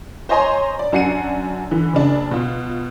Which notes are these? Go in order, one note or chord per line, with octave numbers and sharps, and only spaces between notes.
C5 C#5 D#5 G#5 A#5 C6
D5
F#2 D4 F#4 C7 C#7 D#7
D3 E3
F#1 C#3 D4
B2 F4